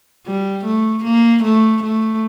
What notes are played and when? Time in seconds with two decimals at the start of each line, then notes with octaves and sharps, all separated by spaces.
0.26 G3
0.64 A3
1.04 A#3
1.43 A3
1.83 A3